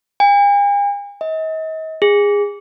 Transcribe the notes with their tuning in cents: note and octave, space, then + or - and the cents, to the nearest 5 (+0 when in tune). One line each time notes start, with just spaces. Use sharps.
G#5 -45
D#5 +40
G#4 -20